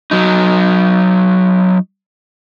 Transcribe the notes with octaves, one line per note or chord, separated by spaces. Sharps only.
F#3 D#4